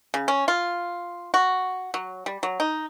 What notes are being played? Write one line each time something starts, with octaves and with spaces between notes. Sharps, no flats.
C#3
C#4
F4
F#4
F#3
G3
F#3
D#4